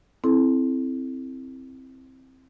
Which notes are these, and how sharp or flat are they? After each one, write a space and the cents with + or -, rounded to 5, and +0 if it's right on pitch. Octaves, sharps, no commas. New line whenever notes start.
C4 +5 E4 +0 A4 -25